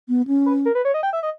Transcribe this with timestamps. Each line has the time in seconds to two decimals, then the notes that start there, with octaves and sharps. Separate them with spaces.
0.09 B3
0.27 C#4
0.46 B4
0.65 A#4
0.75 B4
0.85 C#5
0.94 D#5
1.03 G5
1.13 E5
1.23 D#5